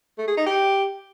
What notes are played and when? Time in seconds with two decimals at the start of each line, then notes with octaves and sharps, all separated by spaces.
0.18 A3
0.28 G#4
0.37 D#4
0.46 G4